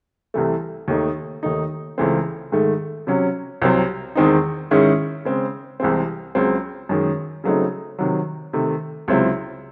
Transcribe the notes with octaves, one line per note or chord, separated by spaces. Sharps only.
C2 C3 E3 A3
D#2 D#3 A3 D#4
D#2 D#3 A3 D#4
C#2 C#3 E3 A3 C4
G#2 D#3 A3
C3 F#3 C#4
C2 C3 F#3 C4
E2 D#3 G#3 C4 D#4
G#2 D#3 G#3 C#4 E4
C#3 G#3 C4
C2 C3 E3 G#3 C4
C#2 C#3 F#3 C4
F#2 D#3 G#3
C#3 F#3 A3 C4 D#4
C3 D#3 F#3
C3 D#3 A3
C#2 C3 F#3 C4 E4